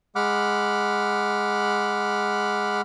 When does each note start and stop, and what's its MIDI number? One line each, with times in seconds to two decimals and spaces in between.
0.16 2.81 56
0.16 2.81 78
0.16 2.81 83
0.16 2.81 86
0.16 2.81 89